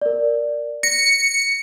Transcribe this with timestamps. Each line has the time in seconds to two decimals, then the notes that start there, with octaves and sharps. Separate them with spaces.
0.02 A#4 D5
0.83 A#6 C#7